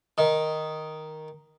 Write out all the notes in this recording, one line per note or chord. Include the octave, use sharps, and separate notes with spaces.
D#3